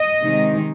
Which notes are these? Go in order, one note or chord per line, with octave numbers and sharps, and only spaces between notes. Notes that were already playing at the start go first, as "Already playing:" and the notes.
Already playing: D#5
C3 D#3 G#3 D#4